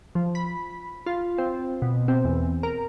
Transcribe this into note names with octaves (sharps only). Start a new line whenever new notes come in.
F3
B5
F4
C4
B2
C4
E2
A#4